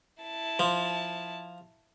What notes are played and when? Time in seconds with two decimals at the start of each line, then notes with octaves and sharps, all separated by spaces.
0.23 E4 A5
0.59 F3